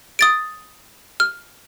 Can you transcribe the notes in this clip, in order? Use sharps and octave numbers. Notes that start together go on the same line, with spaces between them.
D#6 A6 D7
F6